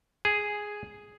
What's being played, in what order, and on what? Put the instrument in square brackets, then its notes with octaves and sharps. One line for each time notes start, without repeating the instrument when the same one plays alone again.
[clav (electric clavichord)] G#4